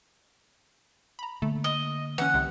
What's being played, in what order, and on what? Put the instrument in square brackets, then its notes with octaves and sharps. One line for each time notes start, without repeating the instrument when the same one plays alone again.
[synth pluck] A#5 B5
[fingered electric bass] D3 A#3 [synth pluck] A3
[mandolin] D#5
[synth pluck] E3 C#4 [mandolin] F#5
[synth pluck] C2 C3